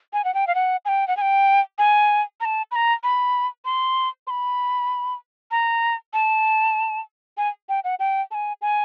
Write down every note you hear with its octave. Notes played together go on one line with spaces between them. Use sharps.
G#5
F#5
G5
F5
F#5
G#5
G5
F#5
G#5
G5
G#5
A#5
A5
B5
A#5
B5
C6
C6
B5
A#5
A5
G#5
G5
F#5
G5
A5
G#5
G#5